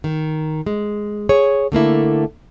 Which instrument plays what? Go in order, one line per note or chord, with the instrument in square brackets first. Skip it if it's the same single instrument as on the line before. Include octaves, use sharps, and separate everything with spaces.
[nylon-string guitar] D#3
G#3
G#4 C#5
D3 A3 A#3 E4